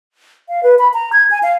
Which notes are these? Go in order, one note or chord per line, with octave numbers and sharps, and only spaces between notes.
F5
B4
B5
A#5
G#6
G#5
F5